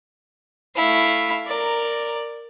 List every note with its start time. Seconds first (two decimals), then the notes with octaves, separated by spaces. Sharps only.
0.76 A3 E4 F5
1.47 A#4 D5 A#5